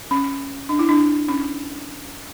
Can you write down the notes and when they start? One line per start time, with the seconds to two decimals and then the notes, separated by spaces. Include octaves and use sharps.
0.11 C#4
0.69 D4
0.79 E4
0.89 D4
1.28 C#4